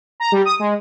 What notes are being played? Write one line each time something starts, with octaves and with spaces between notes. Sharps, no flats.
A#5
G3
D#6
G#3